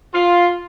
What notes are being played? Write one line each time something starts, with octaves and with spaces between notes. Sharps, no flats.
F4